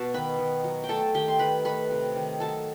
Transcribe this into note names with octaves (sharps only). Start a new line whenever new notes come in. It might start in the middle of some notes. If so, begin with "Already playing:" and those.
Already playing: B2 B3 F#4 A5
D#3 B4 B5
D#3
F#3
G5
A3 A4 A5
D#3 G4 G5
C6
D#3 B4 B5
A3 B4 B5
C3
D#3
F#3 A4 A5